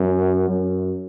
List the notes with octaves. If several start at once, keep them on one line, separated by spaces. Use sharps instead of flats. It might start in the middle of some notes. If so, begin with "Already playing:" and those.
Already playing: F#2
F#2